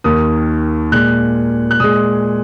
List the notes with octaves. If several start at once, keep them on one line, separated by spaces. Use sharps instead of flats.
D#2 D#3 A#3 D#6
A#2 G#3 F#6
F#6
A#2 G#3 D#6